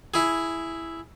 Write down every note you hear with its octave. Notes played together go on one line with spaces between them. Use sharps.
E4 G#4